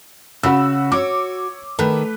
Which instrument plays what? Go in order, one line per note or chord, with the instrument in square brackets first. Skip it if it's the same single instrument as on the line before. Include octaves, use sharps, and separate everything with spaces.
[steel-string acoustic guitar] C#3 [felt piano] F#4 B5 E6
[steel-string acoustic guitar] F#4 [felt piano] C#5 D6
[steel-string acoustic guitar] D#3 [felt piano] A3 B4